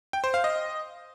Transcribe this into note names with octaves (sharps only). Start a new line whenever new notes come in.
G5
C5
F5
D#5